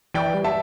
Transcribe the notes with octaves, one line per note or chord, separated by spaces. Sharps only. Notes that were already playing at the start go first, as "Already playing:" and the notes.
E3 D5 G5
G3
E5 A5